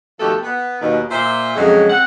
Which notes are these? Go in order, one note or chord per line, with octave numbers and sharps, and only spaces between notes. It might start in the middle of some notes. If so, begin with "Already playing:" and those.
B2 D#3 F3 A3 G4 A4
B3
D#2 B2
A#2 C5 E5
F2 C#3 F#3 G#3
C4 F#5